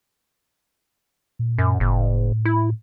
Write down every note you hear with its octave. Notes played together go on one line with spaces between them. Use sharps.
A#2
F#2
F#1 A2
E4